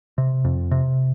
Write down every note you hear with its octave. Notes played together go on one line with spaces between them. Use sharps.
C3
F2
C3